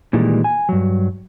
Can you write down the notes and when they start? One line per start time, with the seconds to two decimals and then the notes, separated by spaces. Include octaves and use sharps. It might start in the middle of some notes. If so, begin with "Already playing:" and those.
0.13 A#2 D#3 E3 G3 G#3
0.44 G#5
0.69 G2 F#3